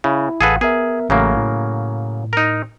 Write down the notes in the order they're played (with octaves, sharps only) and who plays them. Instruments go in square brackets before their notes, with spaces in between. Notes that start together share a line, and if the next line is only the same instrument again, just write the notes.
[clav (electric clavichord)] C#3 [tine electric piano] E4
[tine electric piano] A1 F5 F#5 [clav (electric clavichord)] G#4 A4 B4
[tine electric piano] B3 A#4 E5 [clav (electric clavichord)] G#4
[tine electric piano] A1 A3 [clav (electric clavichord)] C#3 F#3 A#3
[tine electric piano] A2
[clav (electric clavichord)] D#4 A#4